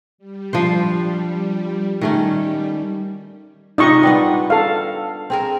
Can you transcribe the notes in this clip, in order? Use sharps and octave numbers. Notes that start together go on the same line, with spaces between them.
G3
F3 D4 C5
D#3 G3 A3 C#4
C3 D#4 F4 D#5 C#6
G3 B3 D4
A4 F5
C4 G#4 A#4